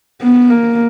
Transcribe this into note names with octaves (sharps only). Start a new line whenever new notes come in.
B3
A#3